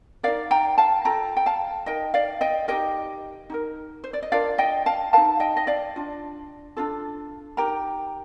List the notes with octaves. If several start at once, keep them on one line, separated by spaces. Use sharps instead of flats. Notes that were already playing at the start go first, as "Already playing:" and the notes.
D#4 A#4 D5 F5
G5 A#5
F5 A5
F4 A4 G5 A#5
G5
F5 A5
D#4 A#4 D#5 G5
D5 F5
D#5 G5
D#4 G4 A#4 D#5 G5
D#4 G4 A#4
C5
D5
D#5
D4 F4 A#4 D5 F5
D#5 G5
F5 A5
D#4 A#4 F5 A5
D#5 G5
D#5
D5 F5
D4 F4
D4 F4 A4
D#4 G4 A#4 G5 A#5